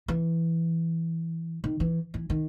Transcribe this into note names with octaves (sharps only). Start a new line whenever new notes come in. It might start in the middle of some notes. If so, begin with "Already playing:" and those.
E3
D#3
E3
E3
D#3